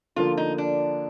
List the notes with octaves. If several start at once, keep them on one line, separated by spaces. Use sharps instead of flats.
D3 F3 A#3 F4
D#4
D4